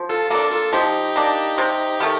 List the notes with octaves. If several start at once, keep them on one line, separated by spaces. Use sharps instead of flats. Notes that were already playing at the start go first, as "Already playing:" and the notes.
Already playing: F3
F4 A4
A#3 D4 F4 A4
F4 A4
F3 D#4 G4
A#3 D4
C3
D#3 A3